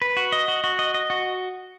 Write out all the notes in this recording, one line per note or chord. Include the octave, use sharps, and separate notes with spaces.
B4
F#4
D#5
F#4
F#4
D#5
D#5
F#4